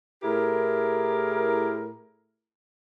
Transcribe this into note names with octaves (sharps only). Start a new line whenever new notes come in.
A2 E4 G4 G#4 A#4